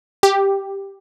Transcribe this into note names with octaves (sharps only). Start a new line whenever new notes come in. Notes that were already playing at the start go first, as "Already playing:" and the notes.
G4